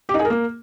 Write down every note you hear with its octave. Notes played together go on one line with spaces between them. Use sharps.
G4
D#4
G#4
A#4
A#3